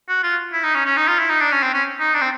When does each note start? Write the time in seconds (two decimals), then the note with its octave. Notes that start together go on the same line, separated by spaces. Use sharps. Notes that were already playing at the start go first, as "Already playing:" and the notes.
0.09 F#4
0.23 F4
0.53 E4
0.63 D#4
0.74 C#4
0.86 C#4
0.97 D#4
1.08 F4
1.19 E4
1.29 D#4
1.41 D4
1.52 C#4
1.63 C4
1.74 C#4
1.99 D#4
2.14 D4
2.22 C4